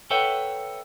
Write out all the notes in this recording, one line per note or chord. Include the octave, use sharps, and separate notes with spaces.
A4 B4 C#5 E5 F#5 G5